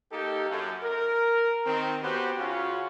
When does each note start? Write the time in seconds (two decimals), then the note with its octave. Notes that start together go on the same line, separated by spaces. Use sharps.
0.11 A#3 D#4 G4 A4
0.50 F#2
0.83 A#4
1.65 D#3 C4
2.02 B3 C#4 F#4 G4 B4 C5
2.38 C#3 C#4 F4 F#4